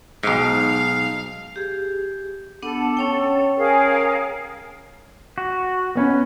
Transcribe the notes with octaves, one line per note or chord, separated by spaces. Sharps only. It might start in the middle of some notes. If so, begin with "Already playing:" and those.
B1 G#2 F5
G4 G#4
B3 D4 A4 F#5
C#4 C#5 G5
G#4 A#4 F5
F#4
B3 C#4 B4